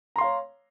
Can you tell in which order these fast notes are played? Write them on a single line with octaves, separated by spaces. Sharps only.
A#5 C6 F5 C#5